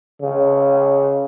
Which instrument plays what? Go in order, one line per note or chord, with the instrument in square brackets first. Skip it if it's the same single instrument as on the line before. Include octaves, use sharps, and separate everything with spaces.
[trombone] C#3